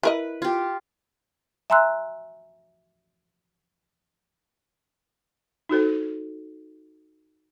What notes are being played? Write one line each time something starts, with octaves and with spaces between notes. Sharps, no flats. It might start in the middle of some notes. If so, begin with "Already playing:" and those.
E4 A#4 B4 D#5
F4 G4
E5 G#5 A#5 C6 E6 F#6
D#4 F#4 A4 C5